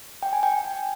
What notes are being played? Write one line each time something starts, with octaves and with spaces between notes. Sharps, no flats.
G5
G#5
G5